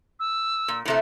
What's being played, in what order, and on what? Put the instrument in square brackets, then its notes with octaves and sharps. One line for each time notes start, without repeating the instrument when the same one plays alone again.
[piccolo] E6
[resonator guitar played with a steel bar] A#2
A2 C3 A3